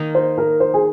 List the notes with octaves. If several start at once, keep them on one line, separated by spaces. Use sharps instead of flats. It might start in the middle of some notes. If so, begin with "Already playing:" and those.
Already playing: D#3 A#3 D#4
C5
A#4
C5
G#4